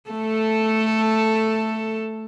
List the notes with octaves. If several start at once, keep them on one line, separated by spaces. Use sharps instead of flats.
A3 A4